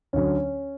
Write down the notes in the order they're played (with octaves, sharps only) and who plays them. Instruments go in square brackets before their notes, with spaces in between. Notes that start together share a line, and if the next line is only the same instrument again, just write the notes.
[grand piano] D2 D3 F#3 C#4